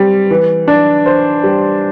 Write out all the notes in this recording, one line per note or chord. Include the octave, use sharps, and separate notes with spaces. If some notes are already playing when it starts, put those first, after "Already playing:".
Already playing: G3 C4
E3
D4
C5
G3